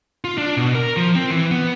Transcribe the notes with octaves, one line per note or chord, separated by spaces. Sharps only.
F4
D4
B2
A#4
F3
C4
E3
B3